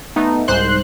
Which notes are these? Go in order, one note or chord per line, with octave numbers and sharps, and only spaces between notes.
A3 B3 D#4
C2 G#2 C5 C6 F#6